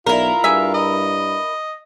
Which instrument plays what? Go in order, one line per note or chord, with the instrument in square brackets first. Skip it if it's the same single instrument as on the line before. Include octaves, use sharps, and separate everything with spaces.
[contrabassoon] B1 [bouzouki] E4 A#4 [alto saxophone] F4
[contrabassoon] G2 [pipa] G#4 E5
[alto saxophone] D#5